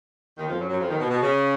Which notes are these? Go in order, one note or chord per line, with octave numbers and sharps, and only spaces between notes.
D#2 D#3
F2 F3
F#2 F#3
F#2 F#3
F2 F3
D#2 D#3
B2
B2
C#3